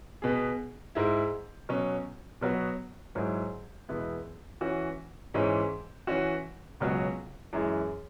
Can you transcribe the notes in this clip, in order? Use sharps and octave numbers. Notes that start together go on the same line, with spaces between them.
B2 B3 G#4
G#2 G#3 E4
B2 F#3 C#4
B2 F#3 B3 F#4
G#2 F#3 E4 G#4
E2 B2 G#3 B3 E4
E3 C#4 F#4
G#2 E3 G#3 C#4
E3 C#4 F#4
C#2 B2 F#3 C#4 F#4
F#2 E3 G#3 E4 G#4